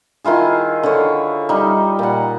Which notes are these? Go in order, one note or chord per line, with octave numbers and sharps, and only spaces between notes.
D#3 E4 F4 G#4
D3 C#5
G3 D#4
A#2 F#5